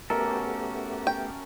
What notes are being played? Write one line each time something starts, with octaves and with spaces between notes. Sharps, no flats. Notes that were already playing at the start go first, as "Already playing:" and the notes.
A3 B3 C#4 F#4 G4 A4 A#4 E5
G5